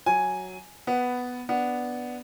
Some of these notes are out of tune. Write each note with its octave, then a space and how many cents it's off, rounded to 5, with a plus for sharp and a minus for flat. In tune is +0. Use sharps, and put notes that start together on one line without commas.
F#3 +0 G#5 +0
B3 +5 B4 +0
B3 +0 D4 +0